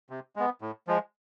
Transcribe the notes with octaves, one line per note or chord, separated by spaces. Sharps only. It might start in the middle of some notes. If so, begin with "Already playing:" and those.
C3
G#3 B3
A2
F3 G#3